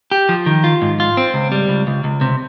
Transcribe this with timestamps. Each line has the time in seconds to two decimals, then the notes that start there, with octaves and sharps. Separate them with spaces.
0.12 G4
0.29 F3
0.46 D#3
0.64 F4
0.82 G#2
1.00 F4
1.17 C4
1.34 C#2
1.52 G3
1.69 C#2
1.87 C#2
2.04 C#2
2.21 C3